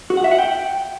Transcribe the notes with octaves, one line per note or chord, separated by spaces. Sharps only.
F#4
F#5
E5
F#5
G5